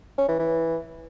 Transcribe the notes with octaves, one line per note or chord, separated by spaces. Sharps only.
C#4
E3
E3